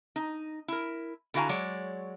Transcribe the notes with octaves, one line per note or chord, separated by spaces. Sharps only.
D#4
E4 A#4
D3 E4 F#4 F5 G#5 A#5
F#3 G#3 C#5 D5